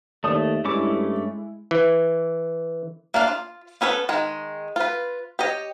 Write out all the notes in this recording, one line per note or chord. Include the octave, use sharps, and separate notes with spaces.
D#2 A3 D5 D#6
G2 G#3 A3 C#4 E4 D6
E3
A#3 D4 F5 A5
F4
B3 C#4 A4 B4
D#3 G#3
F4 B4
G4 C#5 D#5